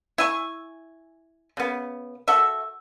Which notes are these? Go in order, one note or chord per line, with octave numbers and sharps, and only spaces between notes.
E4 G#5 C#6
C#3 B3
F#4 A4 E5